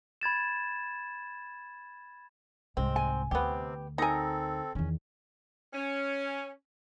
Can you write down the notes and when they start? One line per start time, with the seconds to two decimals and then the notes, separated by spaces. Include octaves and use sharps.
0.21 B5 G#6 A6 E7
2.77 C2 G#2 G#3 C4
2.96 G#5
3.31 D2 C3 B3 C4 G4
3.98 C4 D#4 A4 A#4 G#5 A#5
4.75 E2 D#3 C#4
5.73 C#4